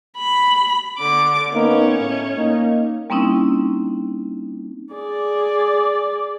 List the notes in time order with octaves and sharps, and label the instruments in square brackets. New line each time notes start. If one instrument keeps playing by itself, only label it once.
[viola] B5
D3 D6
[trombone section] A#3 B3 D#4 [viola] C#4
[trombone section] A2
A#3 D#4
[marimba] G3 A#3 C4 C#4 D#4 E4
[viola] G#4 D5